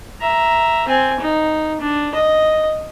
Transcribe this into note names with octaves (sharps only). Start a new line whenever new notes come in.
E5 A#5
C4 G#5
D#4
D4
D#5